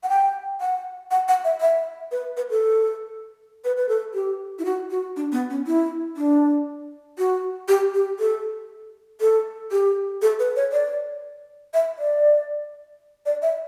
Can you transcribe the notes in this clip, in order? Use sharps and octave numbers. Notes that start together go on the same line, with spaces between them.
F#5
G5
F#5
F#5
F#5
E5
E5
B4
B4
A4
B4
B4
A4
G4
E4
F#4
F#4
D4
B3
C#4
E4
D4
F#4
G4
G4
A4
A4
G4
A4
B4
C#5
D5
E5
D5
D5
E5